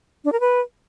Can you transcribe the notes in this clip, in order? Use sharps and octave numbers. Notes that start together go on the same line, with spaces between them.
D4
A#4
B4